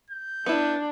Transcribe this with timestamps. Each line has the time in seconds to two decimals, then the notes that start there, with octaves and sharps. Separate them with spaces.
0.10 G6
0.46 B3 D4 E4